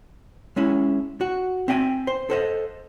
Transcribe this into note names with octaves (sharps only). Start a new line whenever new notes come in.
G#3 C#4 E4
F#4
C4 E5 G5 G#5
C5
A4 C5 D#5